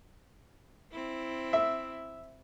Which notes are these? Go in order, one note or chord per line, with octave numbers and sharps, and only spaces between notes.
C4 E4
E5